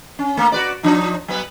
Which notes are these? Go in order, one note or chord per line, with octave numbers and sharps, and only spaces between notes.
C#4
A3 A#3
F#4 B4 D5
F3 D4 D#4
F#3 B3 B4